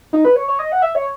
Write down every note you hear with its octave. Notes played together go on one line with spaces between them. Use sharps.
D#4
B4
C#5
C#5
D#5
F#5
E5
C#5